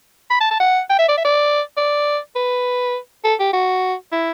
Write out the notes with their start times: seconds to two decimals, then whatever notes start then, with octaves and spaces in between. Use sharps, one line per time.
0.30 B5
0.40 A5
0.51 A5
0.60 F#5
0.90 G5
0.99 E5
1.08 D5
1.17 E5
1.25 D5
1.77 D5
2.36 B4
3.24 A4
3.40 G4
3.53 F#4
4.12 E4